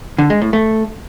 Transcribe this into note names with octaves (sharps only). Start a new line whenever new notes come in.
D3
G#3
A2
A3